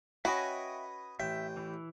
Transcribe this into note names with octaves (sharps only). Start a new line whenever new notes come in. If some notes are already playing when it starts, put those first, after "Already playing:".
C#4 F#4 B4 D#5 E5 G5 G#5 C#6
A1 E5 G5
E3 E4